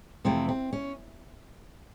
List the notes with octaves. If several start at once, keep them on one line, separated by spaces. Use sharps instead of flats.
F2 C3 E3 A3 C4
C4
C#4